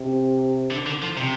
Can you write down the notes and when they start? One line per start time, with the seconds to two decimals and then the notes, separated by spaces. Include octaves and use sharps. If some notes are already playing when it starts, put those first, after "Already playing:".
Already playing: C3
0.71 D3
0.86 D3
1.02 F3
1.17 C3